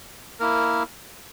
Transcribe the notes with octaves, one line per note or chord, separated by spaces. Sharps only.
A#3 E4 A#4